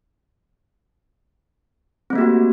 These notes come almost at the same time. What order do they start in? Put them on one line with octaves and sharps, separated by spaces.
C4 A3 A#3 G4 F#4